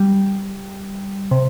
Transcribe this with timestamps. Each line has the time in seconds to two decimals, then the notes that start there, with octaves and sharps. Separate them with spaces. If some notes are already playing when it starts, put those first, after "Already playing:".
Already playing: G3
1.31 C3